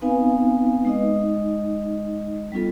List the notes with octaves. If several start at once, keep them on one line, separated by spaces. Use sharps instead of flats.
B3 C4 D#4 B4 F5 G#5
G#3 D#4 D#5
G3 B3 C#4 F4 A4